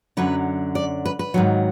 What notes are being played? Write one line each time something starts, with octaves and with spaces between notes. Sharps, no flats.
F#2 D3 F#3 B4
D5
B4
B4
G#2 D#3 F#3